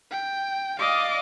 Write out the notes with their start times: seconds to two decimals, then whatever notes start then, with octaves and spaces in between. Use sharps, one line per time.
0.11 G5
0.79 D5 D#5 F5 D6